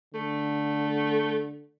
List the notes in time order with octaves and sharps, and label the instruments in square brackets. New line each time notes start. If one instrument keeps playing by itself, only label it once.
[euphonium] D3 [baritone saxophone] A3